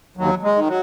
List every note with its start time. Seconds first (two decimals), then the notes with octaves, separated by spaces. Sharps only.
0.17 D#2 F#3
0.42 G#3
0.55 D#3
0.68 F#3